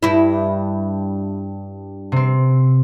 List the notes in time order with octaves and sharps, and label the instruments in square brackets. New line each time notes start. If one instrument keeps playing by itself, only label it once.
[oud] G2 E4
[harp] C3 C4